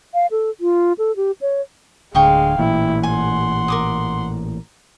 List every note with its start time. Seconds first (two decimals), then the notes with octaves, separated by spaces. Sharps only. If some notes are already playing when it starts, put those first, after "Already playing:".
0.14 F5
0.31 A4
0.61 F4
0.98 A4
1.16 G4
1.41 C#5
2.15 D1 D3 G#3 F5 G5 C#6 D#6
2.58 A1 A#2 E3 E4
3.03 F#5 G#5 C6
3.68 A#4 D6 D#6